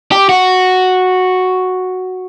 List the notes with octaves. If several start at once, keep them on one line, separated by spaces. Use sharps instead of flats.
G4
F#4